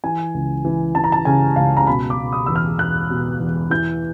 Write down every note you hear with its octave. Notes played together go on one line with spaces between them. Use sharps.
E3 G#5
C#2
E3
E3 A5
A#5
A5
C#3 G#5
C#2 F5
A#5
B2 B5
D6
B2
D#6
E2 E6
F6
E2 F#6
B2
E2
E3 G6